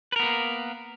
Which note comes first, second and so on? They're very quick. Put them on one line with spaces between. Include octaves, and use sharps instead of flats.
B4 A#4 B3 A#3